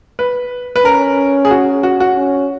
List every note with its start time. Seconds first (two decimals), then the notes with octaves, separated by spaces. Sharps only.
0.19 B4
0.76 B4
0.85 C#4 A#4
1.45 G#4
1.51 F#4
1.83 F#4
2.00 F#4
2.17 C#4